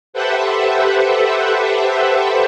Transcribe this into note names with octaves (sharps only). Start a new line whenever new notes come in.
G4 A4 B4 C5 E5 F#5